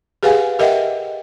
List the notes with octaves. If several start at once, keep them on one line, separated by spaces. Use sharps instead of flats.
G4 G#4 B4 F5 F#5 G#5
G4 A#4 D#5 E5 F#5 G5